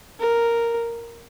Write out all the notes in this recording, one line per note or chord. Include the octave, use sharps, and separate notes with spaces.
A#4